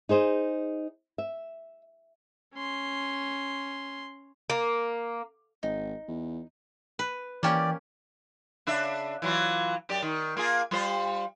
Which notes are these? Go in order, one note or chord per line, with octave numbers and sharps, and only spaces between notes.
D#4 G#4 C5 D#5
E5
C#4 C6
A#3
G#1 D#4
E2
B4
E3 A#3 C#4 G4 D5 G5
C#3 D4 E5
E3 F#3 F4
F#2 G4 D5
D#3
A#3 F4 G#4
G3 F4 C5